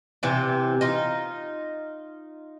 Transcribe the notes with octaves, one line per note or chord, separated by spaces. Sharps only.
C3 E3 G4
D#4 F4